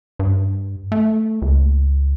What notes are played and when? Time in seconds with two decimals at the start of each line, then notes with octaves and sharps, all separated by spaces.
0.19 G2
0.92 A3
1.42 C#2